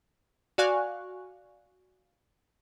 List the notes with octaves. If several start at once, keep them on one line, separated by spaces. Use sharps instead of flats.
F#4 D5 F5 G#5 C#6 F#6